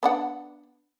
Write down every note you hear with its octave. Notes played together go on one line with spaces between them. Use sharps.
B3 D4 F#5